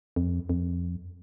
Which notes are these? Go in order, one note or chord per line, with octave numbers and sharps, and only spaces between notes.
F2
F2